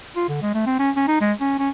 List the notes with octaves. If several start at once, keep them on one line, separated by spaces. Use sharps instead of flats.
F4
D3
G#3
A3
C4
C#4
C#4
D#4
G#3
C#4
C#4